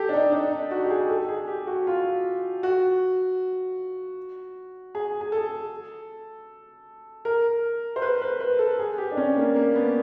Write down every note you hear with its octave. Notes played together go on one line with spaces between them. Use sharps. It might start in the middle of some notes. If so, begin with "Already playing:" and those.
Already playing: G4 A4
D4
D#4
D4
D#4
F#4
G4
G#4
A4
G#4
G4
F#4
F4
F#4
G#4
G#4
A4
A#4
C5
B4
B4
B4
A4
G#4
G4
D4
C#4
A#3
A#3
B3